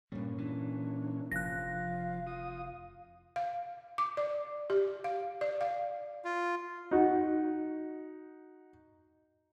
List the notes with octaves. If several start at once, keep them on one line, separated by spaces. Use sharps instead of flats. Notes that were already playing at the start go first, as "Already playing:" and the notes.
G2 A#2 G3 C#4
E3 D4
F1 F3 F5 F#6 A#6
F4 D#6
F5
D6
D5
G4
F5
D5
F5
F4
D#4 F#4